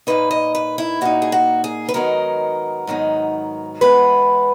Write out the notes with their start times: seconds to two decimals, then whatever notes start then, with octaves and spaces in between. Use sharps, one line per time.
0.07 A#2 A#3 D#4 B4
0.31 D#5
0.55 B4
0.78 E4
1.01 A#2 A#3 D#4 F#4
1.22 G#4
1.32 F#4
1.64 G#4
1.89 B4
1.94 G#2 D#3 F#3 B3 D#4 A#4
2.87 G#2 D#3 F#3 B3 D#4
3.81 F#2 E3 G#3 B3 B4